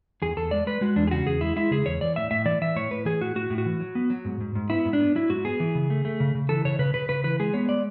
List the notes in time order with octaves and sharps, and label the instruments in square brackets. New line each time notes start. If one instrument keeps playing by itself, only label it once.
[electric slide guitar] E2 G#4
E2 A4
G#3 D5
G#3 B4
G#3 F#4
E2 D4
G#4
C#3 F#4
E2 G#4
G#3 E4
G#3 E4
C#3 G#4
E2 C#5
E3 D5
A2 E5
A2 E5
E3 D5
E3 E5
A2 C#5
A2 B4
E3 G#4
A2 F#4
A2 F#4
A2
F#4
E3
F#3
B3
F#3
G#2
G#2
G#2
B3 E4
G#2
D4
B3
F#3 E4
G#2 F#4
B3 G#4
E3
C#3
A3
A3
C#3
C#3
E3 A4
C#3 C#5
C#3 B4
C#3 B4
C#3 B4
E3 B4
G#3 G#4
B3 C#5
G#3 D5